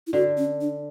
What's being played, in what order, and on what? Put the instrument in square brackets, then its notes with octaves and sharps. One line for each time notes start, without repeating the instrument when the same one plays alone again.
[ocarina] E4
[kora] D3 [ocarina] F#4
[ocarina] C#4
D4